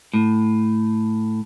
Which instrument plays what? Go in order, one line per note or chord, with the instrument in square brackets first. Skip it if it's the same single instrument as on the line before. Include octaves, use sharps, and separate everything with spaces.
[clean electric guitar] A2